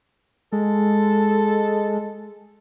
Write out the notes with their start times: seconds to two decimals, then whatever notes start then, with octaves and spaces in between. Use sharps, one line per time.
0.52 G#3 A4